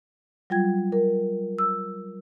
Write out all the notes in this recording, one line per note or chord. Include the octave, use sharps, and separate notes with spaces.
F#3 G3 F4 G5 G#6
A#4
E6